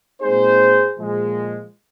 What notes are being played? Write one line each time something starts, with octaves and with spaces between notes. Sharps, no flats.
A#2 G#3 C4 D#4 G#4 C5
A#2 F3 G#3